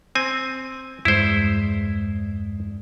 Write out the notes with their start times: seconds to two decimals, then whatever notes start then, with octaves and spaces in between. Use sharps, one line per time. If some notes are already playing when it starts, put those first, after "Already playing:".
0.15 C4 G#5
1.05 E2 G2 G#3 E4 C5